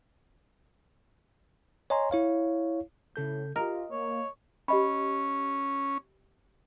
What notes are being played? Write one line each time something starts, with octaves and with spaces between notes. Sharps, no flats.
C#5 D#5 G#5 A#5 C6
E4 C#5 F5
A2 C#3 A4 G6
F4 G4 A#4 D#5
A#3 C#5
C#4 G4 D#5 B5